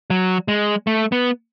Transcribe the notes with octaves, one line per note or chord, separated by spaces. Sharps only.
F#3
G#3
A3
B3